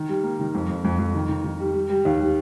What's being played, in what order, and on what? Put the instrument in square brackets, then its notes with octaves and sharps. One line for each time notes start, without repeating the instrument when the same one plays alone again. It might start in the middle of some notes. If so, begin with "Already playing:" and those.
Already playing: [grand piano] D#3
G3
A#3
D#3
F2
F2
F2
F2
D#3
D#3
D#3
G3
G3
G3
D#2
G3